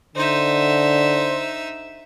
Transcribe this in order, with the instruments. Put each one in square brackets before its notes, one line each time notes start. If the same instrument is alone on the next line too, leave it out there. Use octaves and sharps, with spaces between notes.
[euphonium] D3 [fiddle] D#4 E5 [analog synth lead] C5